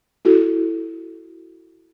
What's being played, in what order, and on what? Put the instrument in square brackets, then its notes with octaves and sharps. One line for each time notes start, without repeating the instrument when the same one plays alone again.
[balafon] E4 F#4 A4